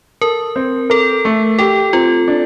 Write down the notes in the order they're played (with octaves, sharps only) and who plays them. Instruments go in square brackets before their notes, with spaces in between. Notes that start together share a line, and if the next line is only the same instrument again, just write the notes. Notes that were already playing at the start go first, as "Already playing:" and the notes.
[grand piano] A4 [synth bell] A#4
[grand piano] C4
[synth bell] A4 [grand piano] A#4
[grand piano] A3
[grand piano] G4 [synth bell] A4
[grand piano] C4 [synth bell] F4
[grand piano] D4